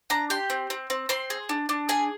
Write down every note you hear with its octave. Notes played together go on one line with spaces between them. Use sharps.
D4 A#5
G4 C6
C4
C4
C4
C4 C6
G#4
D4
D4
G#4 G#5